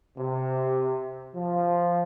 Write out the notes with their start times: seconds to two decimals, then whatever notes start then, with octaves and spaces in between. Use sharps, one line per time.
0.17 C3
1.34 F3